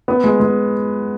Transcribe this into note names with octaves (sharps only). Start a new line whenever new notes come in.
B3
G#3
G#3